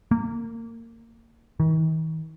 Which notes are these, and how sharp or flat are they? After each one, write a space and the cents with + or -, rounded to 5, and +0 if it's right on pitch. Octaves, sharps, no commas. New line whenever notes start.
A#3 -25
D#3 +45